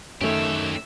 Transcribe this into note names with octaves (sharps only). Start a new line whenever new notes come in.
F#2 D#3 A3 C#4 G4 C#5 E5 E6